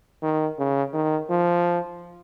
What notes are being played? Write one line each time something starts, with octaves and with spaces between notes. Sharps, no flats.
D#3
C#3
D#3
F3